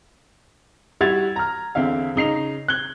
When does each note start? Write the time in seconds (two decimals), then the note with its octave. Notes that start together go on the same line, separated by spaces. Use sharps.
1.01 G3 E4 F#4 G#6 A6 F7
1.36 A#5 F6
1.75 E2 D3 C4 E5 F5
2.16 C#3 D#4 C7 F7
2.68 F#6 G#6 G7